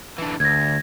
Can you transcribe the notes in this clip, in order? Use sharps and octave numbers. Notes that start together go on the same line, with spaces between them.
D3 E3
D2 G#6 A#6